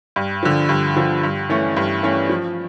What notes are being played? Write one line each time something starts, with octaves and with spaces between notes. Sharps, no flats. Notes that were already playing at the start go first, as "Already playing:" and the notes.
G2
D3 F3
G2
D3 F3
G2
E3 A3 C#4
G2
E3 A3 C#4
F3